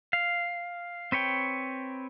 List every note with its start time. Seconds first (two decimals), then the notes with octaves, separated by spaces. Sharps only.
0.13 F5
1.12 C4 B4 C#5 G5